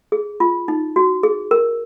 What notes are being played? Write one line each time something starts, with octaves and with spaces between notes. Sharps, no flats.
G#4
F4
D#4
F#4
G#4
A#4